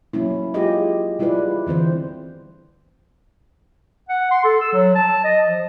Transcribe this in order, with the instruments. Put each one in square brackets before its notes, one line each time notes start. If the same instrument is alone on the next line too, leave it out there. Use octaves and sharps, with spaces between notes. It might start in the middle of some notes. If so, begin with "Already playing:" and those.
[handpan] F#3 A#3 C#4 E4
F4 G4 G#4 D#5
G3 E4 F4 G#4 B4 D5
D3 E3 C4 C5
[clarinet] F#5
C6
A4
E6
F#3
A5
D#5
F3